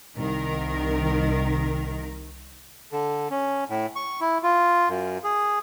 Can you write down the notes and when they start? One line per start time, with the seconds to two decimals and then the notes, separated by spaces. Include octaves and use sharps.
0.17 C2 D#3 A#4
2.92 D3
3.31 C#4
3.69 A2
3.96 C#6
4.21 E4
4.43 F4
4.89 F#2
5.24 G#4